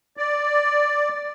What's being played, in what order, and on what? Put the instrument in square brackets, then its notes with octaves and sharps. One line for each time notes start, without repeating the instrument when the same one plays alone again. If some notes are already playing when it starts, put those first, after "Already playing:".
[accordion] D5